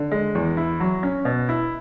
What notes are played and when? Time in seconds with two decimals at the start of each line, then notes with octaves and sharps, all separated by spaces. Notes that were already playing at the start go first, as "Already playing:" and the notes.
Already playing: D3
0.12 G#3
0.35 E2
0.57 E4
0.80 F#3
1.03 C#4
1.25 B2
1.49 E4